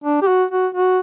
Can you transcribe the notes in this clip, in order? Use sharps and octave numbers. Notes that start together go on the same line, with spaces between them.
D4
G4
F#4
F#4
F#4